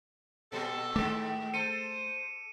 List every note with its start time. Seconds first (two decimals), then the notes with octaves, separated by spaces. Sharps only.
0.52 A#2 G3 A4
0.96 G#2 D#3 G#3 A3 D6
1.54 A4 C5 C#7 D#7